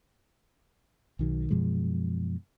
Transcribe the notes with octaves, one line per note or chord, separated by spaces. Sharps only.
B1 D#3 F#3
F#2 B2 F3 G#3